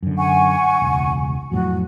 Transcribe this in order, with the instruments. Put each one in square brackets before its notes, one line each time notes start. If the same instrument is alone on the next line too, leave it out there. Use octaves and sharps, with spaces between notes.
[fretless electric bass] F#2 D3
[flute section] F#5 G#5 C#6
[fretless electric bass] E1 C#2
[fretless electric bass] F2 A2 F#3 [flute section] F#4